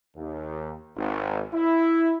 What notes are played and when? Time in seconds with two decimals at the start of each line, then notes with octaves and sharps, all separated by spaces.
0.16 D#2
0.96 G#1
1.54 E4